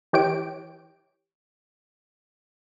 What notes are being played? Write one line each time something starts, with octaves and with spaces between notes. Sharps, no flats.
E3 G4 C#5 G5 D7